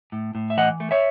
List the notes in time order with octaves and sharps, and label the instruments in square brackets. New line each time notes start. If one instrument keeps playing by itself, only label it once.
[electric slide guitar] A2
A2
E5
E3 D#5 F#5
A3
C#5 E5